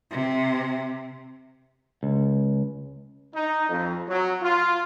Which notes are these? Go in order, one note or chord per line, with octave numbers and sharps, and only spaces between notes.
C3
C#2
D#4
F2
F#3
F4